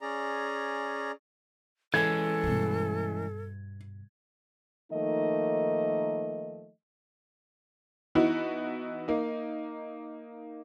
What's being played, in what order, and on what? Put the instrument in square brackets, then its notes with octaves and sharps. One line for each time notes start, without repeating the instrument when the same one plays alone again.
[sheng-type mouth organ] C#4 G#4 D5 A#5
[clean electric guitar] E3 G#3 C#4 [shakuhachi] A4 [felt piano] G#6
[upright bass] G2 B2
[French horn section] D#3 F3 A3 A#3 D#4 D#5
[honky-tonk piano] E3 B3 D#4 E4 F#4
A#3 D#4